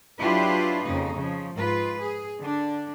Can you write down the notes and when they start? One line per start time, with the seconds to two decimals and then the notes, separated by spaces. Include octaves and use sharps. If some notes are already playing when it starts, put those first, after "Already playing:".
0.19 F#3 D4 E4 F4 G4 B4
0.84 F2 C#3 A#3 D#4
1.16 C#3 F3
1.54 G#2 F4 B4
2.01 G#4
2.39 D3 D4